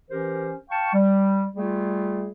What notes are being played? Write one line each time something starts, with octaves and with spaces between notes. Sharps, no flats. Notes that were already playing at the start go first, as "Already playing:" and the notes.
E3 C#4 G4 A#4 C5
F5 G5 A5 C#6
G3
G3 A3 F4 G#4